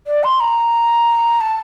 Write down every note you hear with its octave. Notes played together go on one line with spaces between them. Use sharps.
D5
C6
A#5
A5